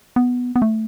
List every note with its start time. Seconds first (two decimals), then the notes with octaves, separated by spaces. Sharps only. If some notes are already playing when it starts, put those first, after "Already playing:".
0.16 B3
0.56 B3
0.62 A3